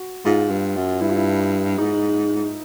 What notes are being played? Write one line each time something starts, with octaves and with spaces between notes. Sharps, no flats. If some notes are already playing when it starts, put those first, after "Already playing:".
Already playing: F#4
G#2 F4
G2
F#2
G2 E4
F4
E4
G#2 D#4